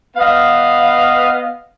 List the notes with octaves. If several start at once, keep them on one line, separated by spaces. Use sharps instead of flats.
B3 B4 D#5 F5